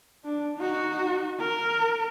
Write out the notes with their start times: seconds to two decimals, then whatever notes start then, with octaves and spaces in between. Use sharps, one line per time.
0.25 D4
0.58 D#4 F#4
1.40 A#4